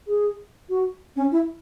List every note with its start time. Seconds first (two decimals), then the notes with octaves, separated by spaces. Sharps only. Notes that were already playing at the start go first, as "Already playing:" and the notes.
0.07 G#4
0.69 F#4
1.16 C#4
1.32 E4